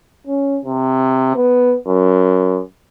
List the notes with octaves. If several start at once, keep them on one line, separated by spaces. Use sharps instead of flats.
C#4
C3
B3
F#2